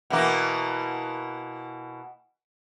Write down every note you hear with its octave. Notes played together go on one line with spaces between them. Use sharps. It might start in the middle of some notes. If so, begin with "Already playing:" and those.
B2 E3 A#3